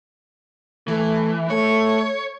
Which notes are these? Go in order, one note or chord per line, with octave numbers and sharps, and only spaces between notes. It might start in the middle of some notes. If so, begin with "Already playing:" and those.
E3 A3
A3 C#5